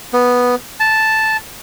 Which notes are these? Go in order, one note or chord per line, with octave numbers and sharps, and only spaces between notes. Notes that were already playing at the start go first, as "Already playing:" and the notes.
B3
A5